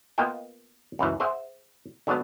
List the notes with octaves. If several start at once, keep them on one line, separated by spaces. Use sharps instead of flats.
A#3 B3 F4 D#5 G5
C#2 F#2 E3
G#4 C5 E5 F#5
D3 F#3 G#3 B3 D4